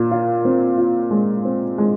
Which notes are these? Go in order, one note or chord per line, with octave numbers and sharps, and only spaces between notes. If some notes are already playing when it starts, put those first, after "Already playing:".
Already playing: A#2
F4
C4
F4
G#3
C4
G#3